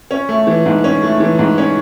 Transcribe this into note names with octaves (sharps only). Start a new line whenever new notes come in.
C#4
A3
E3
G#2
C#4
A3
E3
G#2
C#4